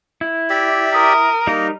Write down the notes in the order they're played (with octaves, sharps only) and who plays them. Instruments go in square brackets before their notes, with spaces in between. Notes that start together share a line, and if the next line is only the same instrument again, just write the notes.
[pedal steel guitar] E4
[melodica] G4 D5 E5
[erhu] A#4 [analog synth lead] D#6
[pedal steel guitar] G3 D#4 A#4 [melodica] A#3 D#5